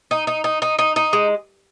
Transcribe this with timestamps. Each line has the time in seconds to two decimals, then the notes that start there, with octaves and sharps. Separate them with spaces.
0.11 D#4
0.27 D#4
0.44 D#4
0.62 D#4
0.79 D#4
0.96 D#4
1.13 G#3